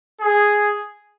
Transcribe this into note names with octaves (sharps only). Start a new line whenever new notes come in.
G#4